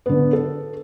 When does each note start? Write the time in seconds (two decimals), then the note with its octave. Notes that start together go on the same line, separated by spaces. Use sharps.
0.06 D3 B3
0.33 A4